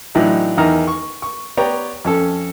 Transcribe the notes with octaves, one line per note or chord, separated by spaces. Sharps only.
A2 E3 F#3 D4 D#4
E2 D#3 D#4 A#5 F6
C#6
C#6
B3 G4 C#5 D5 G5 A#5
F2 C#4 A4